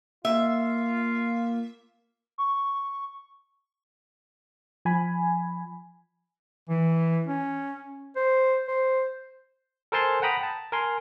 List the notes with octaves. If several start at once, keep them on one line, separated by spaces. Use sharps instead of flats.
A#3 F4 E5
C#6
F3 G#5 B5
E3
C#4
C5
C5
A4 A#4 C5 G#5 A5 C6
F#5 G5 A#5 B5 D#6
A5
A#4 G#5 C6